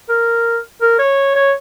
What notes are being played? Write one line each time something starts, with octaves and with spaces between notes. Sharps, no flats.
A#4
A#4
C#5
C#5